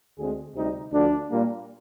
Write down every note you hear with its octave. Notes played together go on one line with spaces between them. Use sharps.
D2 D3 G#3 C4 G#4
D2 C3 G3 C4 D#4
D2 D3 F3 D4
A#2 G3 A#3